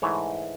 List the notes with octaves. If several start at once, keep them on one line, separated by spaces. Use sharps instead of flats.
G#2 E3 A3 C#5